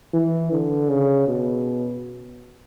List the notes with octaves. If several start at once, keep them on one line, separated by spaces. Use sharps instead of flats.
E3
D3
C#3
B2